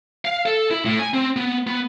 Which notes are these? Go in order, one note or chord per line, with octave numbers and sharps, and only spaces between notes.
F5
A4
E4
A2
G#5
C4
B3
B3